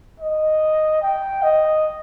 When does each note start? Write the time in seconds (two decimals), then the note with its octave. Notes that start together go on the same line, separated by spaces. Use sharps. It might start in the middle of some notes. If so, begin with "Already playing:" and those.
0.20 D#5
1.02 G5
1.43 D#5